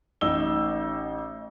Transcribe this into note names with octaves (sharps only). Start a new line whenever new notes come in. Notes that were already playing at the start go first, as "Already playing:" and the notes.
A1 D#4 E6 G7